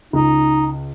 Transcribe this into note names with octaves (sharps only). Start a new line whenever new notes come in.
C#2 D#4